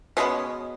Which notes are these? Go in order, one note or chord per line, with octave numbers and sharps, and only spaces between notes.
B2 G#3 B3 C#4